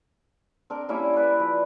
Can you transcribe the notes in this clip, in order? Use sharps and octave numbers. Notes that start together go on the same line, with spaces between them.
C4 D4 A#4
G3 A#3 C#4 E4
B4 D5
F3